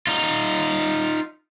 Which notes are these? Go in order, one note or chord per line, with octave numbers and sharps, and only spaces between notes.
D#4 F4